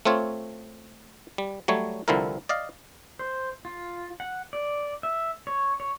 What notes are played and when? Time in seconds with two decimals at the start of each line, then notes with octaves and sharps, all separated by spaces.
0.05 A3 C4 F4 C#5
1.38 G3
1.68 F#3 G3 A3 C#5
2.08 C2 D3 F3 C4 E4 A#4
2.49 D5 D#5 F5
3.19 C5
3.65 F4
4.20 F#5
4.53 D5
5.03 E5
5.47 C#5
5.80 C#5